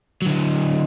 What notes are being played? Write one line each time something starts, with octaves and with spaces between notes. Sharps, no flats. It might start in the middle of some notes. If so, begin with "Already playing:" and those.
D3 F#3